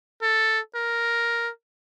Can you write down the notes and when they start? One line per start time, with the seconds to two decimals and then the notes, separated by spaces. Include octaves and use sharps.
0.22 A4
0.75 A#4